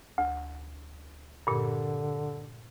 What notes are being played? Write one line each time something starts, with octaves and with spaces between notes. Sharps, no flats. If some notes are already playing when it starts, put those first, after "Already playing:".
D2
G2 A#2 D3